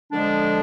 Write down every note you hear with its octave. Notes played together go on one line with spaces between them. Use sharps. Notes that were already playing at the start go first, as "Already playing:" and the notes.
D3 F3 G#3 D4